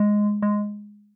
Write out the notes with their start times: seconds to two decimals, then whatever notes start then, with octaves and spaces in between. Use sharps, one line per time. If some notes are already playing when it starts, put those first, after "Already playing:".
Already playing: G#3
0.43 G#3